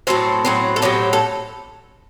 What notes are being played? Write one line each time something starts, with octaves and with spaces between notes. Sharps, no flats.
A2 F#3 C4 A4
A2 F#3 C4
A4
A2 F#3 C4 G4
A4